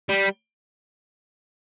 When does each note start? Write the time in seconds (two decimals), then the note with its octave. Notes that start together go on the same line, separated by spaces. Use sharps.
0.09 G3